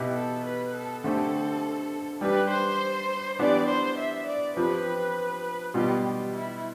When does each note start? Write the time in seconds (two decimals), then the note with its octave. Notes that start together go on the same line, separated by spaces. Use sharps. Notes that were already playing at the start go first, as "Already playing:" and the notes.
Already playing: B2 B3 E4 G4
0.15 A4
0.45 B4
0.74 A4
1.04 D3 A3 C4 G4 A4
2.21 G3 D4 G4 B4
2.50 C5
3.39 E3 B3 D4 G4 D5
3.69 C5
3.99 E5
4.27 D5
4.57 F3 C4 G4 B4
5.74 B2 G3 B3 F4 G4
6.04 G4
6.34 E4